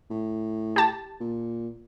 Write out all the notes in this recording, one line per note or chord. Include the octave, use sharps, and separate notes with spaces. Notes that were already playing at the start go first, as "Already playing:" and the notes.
A2
G4 A5
A#2